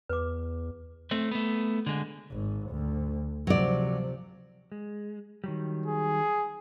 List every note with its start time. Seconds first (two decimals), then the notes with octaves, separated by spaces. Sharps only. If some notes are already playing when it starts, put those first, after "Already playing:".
0.09 E2 B4 D6
1.11 A3 C4
1.31 A3 B3
1.86 D3 G#3
2.32 G#1
2.71 D2
3.47 C3 F3 F#3 D5
4.72 G#3
5.44 D#3 F#3 G3
5.86 G#4